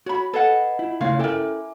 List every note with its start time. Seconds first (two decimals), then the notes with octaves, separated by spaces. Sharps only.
0.06 F#4 C#5 B5
0.33 A4 B4 D#5 F#5 B5 G#6 C7
0.79 E4 F4
1.01 C#3 A3 A#3 C#4 E4 F4 C#5 F5
1.19 E4 A4 A#4 E5 G5 G#5 D6